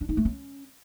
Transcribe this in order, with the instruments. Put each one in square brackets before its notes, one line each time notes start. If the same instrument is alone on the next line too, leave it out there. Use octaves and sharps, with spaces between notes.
[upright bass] D4
D#4
A3
C#4